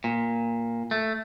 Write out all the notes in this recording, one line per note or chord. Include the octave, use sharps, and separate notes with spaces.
A#2
A3